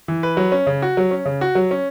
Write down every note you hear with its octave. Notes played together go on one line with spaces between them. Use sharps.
E3
B4
F#3
C#4
C#3
F#4
F#3
C#4
C#3
F#4
F#3
C#4